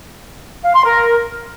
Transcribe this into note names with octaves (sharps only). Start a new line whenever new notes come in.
F5
C6
A#4